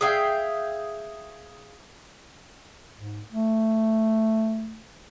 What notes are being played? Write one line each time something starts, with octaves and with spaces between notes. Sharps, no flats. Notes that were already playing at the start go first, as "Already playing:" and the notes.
G#4 E5 F5 G5
G#2
A3